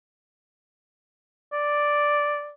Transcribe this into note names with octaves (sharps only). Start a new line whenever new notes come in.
D5